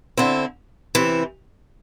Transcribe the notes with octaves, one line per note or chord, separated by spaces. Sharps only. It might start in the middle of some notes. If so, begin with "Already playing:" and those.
D3 C4 E4
C3 E3 C4 E4